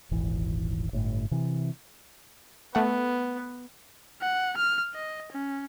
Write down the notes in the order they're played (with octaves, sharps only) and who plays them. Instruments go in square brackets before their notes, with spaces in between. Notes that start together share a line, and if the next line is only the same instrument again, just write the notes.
[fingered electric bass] D#1 G#1 E3
G1 A2
C3 E3
[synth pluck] A3 F#5 [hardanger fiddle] B3
[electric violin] F#5
F6
D#5
C#4